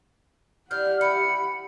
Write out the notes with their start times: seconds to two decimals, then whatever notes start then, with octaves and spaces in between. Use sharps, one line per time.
0.71 D4 E4 G4 F#5 F6 G6
1.01 E3 B5 C#7